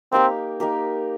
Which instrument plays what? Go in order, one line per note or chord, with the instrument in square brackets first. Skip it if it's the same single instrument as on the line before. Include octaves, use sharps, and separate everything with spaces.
[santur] A#3 D#4 G4 A#4 [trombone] C4
[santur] A#3 D#4 G4 A#4